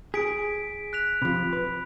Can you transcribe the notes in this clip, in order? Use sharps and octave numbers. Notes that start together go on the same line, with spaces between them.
G#4 B6 D7
F#6 B6 F7
C3 F3 B5
B4